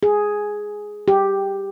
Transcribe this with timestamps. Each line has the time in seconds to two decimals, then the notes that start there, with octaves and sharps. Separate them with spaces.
0.03 G#4
1.08 G4